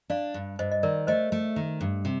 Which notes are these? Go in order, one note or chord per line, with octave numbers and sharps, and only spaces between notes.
D4 D5 F5
G2
G2 C5 D#5
D#5
D#3 A#4 D5
A3 C5 D#5
A3
D#3
G2
C3